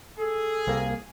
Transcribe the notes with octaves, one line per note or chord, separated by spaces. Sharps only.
G#4 A4
C2 A#3